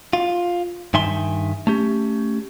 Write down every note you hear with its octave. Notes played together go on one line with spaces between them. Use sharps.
F4
G2 D#3 E5 G#5 C6
A3 C#4 G4